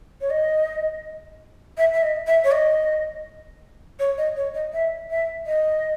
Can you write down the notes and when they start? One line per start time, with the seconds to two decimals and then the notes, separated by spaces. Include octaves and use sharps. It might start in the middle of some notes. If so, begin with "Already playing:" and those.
0.21 C#5
0.30 D#5
1.78 E5
1.94 E5
2.03 D#5
2.27 E5
2.44 C#5
2.52 D#5
3.99 C#5
4.18 D#5
4.37 C#5
4.54 D#5
4.73 E5
5.10 E5
5.46 D#5